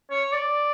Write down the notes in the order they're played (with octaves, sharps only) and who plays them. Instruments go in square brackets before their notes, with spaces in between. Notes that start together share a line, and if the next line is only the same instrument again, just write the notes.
[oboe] C#5
D5